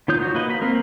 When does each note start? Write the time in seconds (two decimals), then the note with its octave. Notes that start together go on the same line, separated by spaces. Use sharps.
0.08 D#3 F4 C#5 D#6 G6
0.22 F#4
0.35 A#3 B4 D#5
0.50 B5
0.62 A#3 C4 A#4